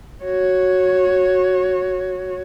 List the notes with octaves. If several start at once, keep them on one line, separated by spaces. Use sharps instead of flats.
F#4 C#5